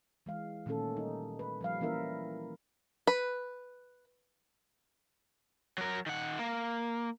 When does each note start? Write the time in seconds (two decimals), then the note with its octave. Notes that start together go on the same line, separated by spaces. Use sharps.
0.26 E3 G#3 F5
0.66 A#2 D#3 A3 C#4 A4
0.96 G3 D#4
1.39 B4
1.61 F3 G3 F5
1.81 E3 A#3 C#4 E4 A#4 E5
3.07 B4
5.78 F#3 A#4
6.06 D#3 F#5
6.39 A#3